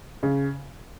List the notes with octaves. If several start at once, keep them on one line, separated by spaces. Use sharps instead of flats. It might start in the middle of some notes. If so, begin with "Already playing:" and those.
C#3